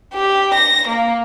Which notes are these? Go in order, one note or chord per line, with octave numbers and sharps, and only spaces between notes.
G4
A#6
A#3